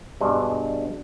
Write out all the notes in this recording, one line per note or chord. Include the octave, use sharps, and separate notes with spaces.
G2 B2 G#3 D4